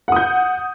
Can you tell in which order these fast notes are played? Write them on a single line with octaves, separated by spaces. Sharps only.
F#5 D#6 G6